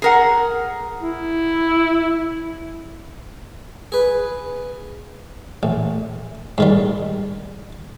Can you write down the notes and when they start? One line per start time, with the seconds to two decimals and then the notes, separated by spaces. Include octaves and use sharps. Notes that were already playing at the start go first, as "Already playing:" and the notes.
0.02 G#4 A#4 F#5
1.00 E4
3.92 G#4 B4
5.63 A1
6.58 G#2 D#3 G3